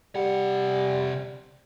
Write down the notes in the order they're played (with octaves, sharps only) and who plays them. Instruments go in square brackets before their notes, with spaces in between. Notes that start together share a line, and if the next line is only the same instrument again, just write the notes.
[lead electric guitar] C3 F#5 [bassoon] G3